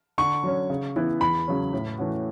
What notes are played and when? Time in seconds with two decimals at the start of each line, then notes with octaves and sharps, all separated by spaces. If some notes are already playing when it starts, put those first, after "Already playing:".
0.18 D3 C#6
0.44 F#3 C#4
0.70 C#3
0.96 E3 B3 E4 B4
1.21 E2 B5
1.48 C#3 F#3 C#4
1.73 A2
1.98 E3 A3 C#4 F#4